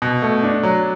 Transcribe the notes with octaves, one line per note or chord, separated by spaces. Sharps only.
B2
A3
D4
F#3